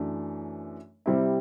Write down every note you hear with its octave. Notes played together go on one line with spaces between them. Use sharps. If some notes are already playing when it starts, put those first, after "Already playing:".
Already playing: F#2 E3 A3 D4
C3 G3 C4 E4